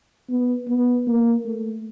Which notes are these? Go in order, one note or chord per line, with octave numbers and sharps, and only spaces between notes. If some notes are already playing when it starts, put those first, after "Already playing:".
B3
B3
A#3
A3